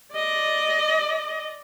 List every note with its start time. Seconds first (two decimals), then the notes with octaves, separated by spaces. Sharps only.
0.14 D5 D#5